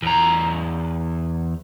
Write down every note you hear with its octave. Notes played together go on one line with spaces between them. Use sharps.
E2 A#5